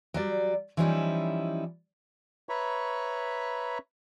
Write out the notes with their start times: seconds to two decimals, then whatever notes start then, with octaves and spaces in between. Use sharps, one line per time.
0.14 F#3 G3 D5
0.77 E3 F3 G3 C#4 D#4 E4
2.49 B4 C#5 E5 A#5 B5 C#6